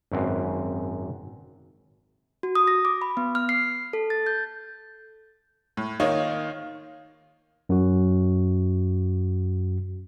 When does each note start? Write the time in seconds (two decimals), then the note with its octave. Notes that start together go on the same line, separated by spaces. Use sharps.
0.12 G#1 F#2 C4 B4
2.43 F#4
2.55 D#6
2.67 A#6
2.85 D6
3.02 B5
3.17 B3
3.35 F6
3.49 C7
3.93 A4
4.10 A6
4.27 G6
5.77 A2
6.00 D#3 A#3 D#4 F4 C#5
7.69 F#2 F#4